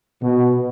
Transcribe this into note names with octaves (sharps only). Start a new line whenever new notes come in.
B2